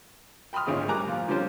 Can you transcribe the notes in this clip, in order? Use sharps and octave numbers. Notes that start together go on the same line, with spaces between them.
G5 B5 C6 D#6 F6
G#1 D2 A#2 C#4 G#4
G3 A#4 G#5 A#5 D6 F#6
A#2 F3
D3 F3 G3 C4 C#4 C5